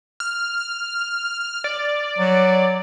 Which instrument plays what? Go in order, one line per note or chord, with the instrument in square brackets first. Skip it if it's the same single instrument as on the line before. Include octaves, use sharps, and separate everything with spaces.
[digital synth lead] F6
D5
[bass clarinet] F#3